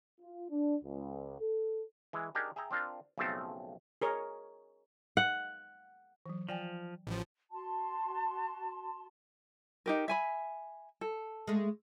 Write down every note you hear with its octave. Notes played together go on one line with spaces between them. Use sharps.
F4
D4
C#2
A4
E3 G#3
D4 D#4 G4 G#4 A#4
G#4 E5 G5 A#5
C4 D4 F4 A#4
B1 C#3 F3 A3 C4 A5
G#4 A#4 C#5
F#5
E3 F#3
F3 D5 G5 G#5
A1 F3
F#4 A5 C6
D#4 G4 A#4
E5 G#5 B5
A4
G#3 A3